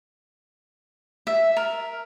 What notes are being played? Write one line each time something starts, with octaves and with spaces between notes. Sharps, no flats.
E5
A#4